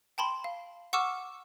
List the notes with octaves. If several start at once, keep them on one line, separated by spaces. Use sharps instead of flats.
G5 A5 B5 C6
F5
F#5 C#6 D6 E6 F6 E7